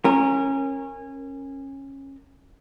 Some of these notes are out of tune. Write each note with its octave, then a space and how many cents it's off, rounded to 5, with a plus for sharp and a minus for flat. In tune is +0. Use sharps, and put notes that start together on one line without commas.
C#4 -20 A#4 -5